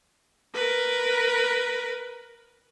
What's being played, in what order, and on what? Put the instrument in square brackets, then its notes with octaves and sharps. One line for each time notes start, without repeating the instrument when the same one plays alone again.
[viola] A#4 B4